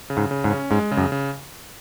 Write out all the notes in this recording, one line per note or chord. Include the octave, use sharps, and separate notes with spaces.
C#3
G#2
C#3
G#2
C#4
G#2 G#3
C#3
F#2
C#3